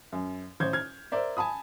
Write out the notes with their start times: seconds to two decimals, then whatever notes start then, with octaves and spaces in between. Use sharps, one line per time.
0.12 F#2
0.60 A1 C5 G6 G#6
0.73 F6 G#6
1.12 A#4 C5 D5 E5
1.37 G#5 A5 B5 D#6